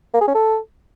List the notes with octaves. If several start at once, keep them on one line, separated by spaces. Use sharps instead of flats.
A#3
G#4
C#4
A4